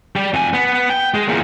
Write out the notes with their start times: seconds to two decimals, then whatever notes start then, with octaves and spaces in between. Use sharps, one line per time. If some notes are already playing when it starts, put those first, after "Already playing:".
0.16 G3
0.34 F2 G#5
0.53 B3
0.90 G5
1.14 G#3
1.28 E2 A#2